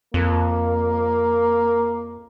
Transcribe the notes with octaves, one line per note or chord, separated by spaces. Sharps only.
F2 A#3